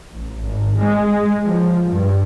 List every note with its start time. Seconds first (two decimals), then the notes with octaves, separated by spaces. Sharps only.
0.13 A1
0.43 G#1
0.77 G#3
1.43 F3
1.87 G2